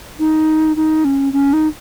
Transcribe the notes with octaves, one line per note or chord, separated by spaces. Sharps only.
D#4
D#4
C#4
C#4
D#4